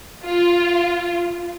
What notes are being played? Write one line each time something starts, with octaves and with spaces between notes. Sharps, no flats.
F4